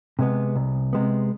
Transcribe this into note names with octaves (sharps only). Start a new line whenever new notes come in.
C3 G#3 B3
C2
C3 G#3 B3